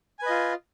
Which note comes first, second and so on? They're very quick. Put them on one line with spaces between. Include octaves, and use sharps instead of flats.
G#5 B4 D#5 F4